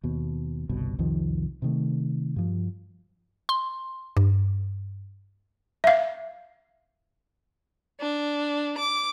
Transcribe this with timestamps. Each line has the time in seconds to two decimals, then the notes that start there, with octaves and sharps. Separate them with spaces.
0.04 D#2 B2
0.69 G1 C2 B2
0.99 C2 F2 D#3 F3
1.62 C3 D#3 A3
2.36 G2 F3
3.49 C6
4.17 G2
5.84 E5 F5
8.00 D4
8.78 D6